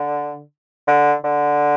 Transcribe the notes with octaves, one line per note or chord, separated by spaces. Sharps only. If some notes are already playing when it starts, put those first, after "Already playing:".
Already playing: D3
D3
D3